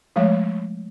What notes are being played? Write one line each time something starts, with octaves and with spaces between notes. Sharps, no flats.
F3 G#3 A3 C#5